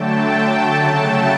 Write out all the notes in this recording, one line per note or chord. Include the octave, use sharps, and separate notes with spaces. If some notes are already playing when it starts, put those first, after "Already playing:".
Already playing: D3 F#3 A3 G5 A5
G5 A5
C#3 F#3 A3 G5 A5